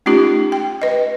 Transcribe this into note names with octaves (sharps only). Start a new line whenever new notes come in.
A3 C#4 D#4 F4 G4
G5
B4 D#5